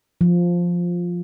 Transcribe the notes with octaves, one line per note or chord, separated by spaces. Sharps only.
F3